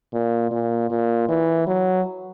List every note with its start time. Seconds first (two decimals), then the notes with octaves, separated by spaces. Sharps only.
0.13 A#2
0.51 A#2
0.90 A#2
1.29 E3
1.67 F#3